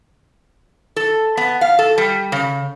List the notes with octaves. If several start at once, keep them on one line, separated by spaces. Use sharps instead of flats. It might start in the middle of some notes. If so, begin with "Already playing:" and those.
A4
B3
F5
A4
G3
C#3